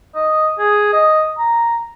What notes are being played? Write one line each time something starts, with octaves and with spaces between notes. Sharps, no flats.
D#5
G#4
D#5
A#5